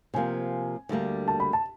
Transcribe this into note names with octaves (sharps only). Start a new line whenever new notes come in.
C3 F3 A#3 G#5
D2 D3 G3 A#3
A5
B5
A5